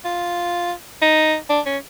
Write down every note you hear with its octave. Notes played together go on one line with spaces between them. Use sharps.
F4
D#4
D4
C#4